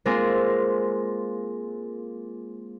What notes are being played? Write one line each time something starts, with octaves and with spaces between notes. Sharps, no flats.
G#3 A#3 C4 F4 G#4 A#4